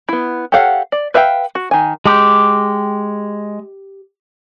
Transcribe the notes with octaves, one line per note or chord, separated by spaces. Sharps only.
B3 E4
G4 A4 C#5 F5 F#5
D5
B4 E5 F5 G5
F#4
D#3 G#5
G#3 G4